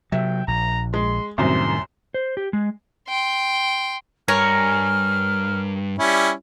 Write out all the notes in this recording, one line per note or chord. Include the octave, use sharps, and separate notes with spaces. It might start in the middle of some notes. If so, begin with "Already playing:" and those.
C3 F#3 E5 G5
A#1 A#5
G#3 C6
C2 F#2 A2 C3 D#3 C6
C5
G4
G#3
G5 C6
G2 A#4 C#5 G#5 F6
G3 C#4 E4